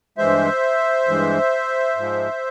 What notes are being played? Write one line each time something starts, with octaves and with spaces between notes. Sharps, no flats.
G2 E3 G#3 C5 E5
G2 E3 G#3
G#2 F3 G#3